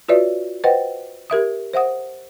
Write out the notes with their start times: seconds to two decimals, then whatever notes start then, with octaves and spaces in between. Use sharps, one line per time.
0.09 F4 F#4 B4 C#5 D5 E5
0.64 B4 C5 D#5 F#5 G5
1.30 G4 A#4 E5 D#6
1.74 C5 E5 F#5 D#6